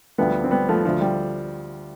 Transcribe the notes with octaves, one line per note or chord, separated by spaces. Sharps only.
D2 D3 F3 G3 B3
C4
G3 B3
F3 A3
D2 D3 F3
G3